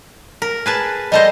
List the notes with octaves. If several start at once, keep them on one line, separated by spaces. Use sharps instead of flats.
A#4
G#4 B4 A5
G3 A4 C5 D#5